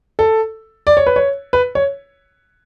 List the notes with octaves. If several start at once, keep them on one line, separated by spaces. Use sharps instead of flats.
A4
D5
C#5
B4
C#5
B4
C#5